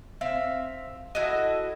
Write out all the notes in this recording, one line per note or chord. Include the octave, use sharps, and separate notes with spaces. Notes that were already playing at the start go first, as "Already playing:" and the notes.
C4 E5 F5
E4 F#4 A4 D#5